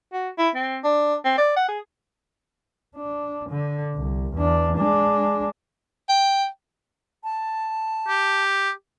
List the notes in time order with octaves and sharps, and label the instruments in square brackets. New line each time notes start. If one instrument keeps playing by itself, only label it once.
[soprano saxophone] F#4
E4
C4
D4
C4
D5
F#5
G#4
[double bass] D4
D3
C2
E2 D4
G#3 D4
[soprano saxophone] G5
[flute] A5
[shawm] G4